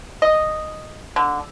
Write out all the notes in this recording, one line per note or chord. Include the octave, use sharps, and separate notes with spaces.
D#5
D3